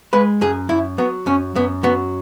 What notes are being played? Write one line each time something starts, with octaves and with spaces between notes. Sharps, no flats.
G#3 B4
F#2 G#4
F#2 E4
F#3 B3
F#2 C#4
F#2 B3
F#3 B3